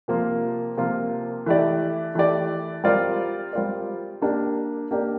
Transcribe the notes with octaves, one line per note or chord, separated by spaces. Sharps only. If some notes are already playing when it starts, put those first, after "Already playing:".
C3 F3 A#3 F4
C3 F3 A#3 F4
E3 A3 E4 G4 D5
E3 A3 E4 G4 D5
G3 C4 F4 A#4 D5
G3 C4 F4 A#4 D5
A#3 D4 G4 D5
A#3 D4 G4 D5